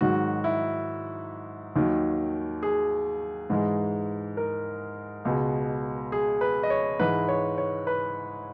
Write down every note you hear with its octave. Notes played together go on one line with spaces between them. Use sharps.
G#2 D#3 F#3 F#4
E4
D#2 D#3 F#3
G#4
G#2 E3 G#3
A#4
C#2 B2 G#3
G#4
B4
D#5
C#5
G#2 E3 G#3 B4
C#5
C#5
B4